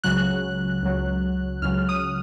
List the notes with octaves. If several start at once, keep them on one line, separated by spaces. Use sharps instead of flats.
C#2 C#3 F#3 F#6
C#2 C#3 F#3
C#2 C#3 F#3 F6
D#6